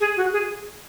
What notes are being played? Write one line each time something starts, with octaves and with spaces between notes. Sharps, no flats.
G#4
F#4
G#4